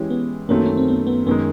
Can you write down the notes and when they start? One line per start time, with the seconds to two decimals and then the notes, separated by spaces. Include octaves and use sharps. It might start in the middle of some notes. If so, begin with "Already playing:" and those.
Already playing: E3 G#3 C#4 E4 G4
0.10 B3
0.48 F#2 D#3 F#3 A3 A#3 C4
0.66 C#4
0.77 C4
0.88 B3
1.07 B3
1.26 F#2 D#3 G#3 B3